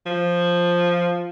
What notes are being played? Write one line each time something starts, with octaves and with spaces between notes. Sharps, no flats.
F3